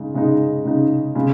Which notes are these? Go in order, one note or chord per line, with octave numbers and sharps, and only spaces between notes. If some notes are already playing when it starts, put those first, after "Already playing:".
Already playing: C#3 G#3 D#4
C#3 G#3 D#4
C#3 G#3 D#4
C#3 G#3